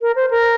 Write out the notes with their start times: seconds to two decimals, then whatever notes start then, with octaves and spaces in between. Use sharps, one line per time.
0.01 A#4
0.16 C5
0.31 A#4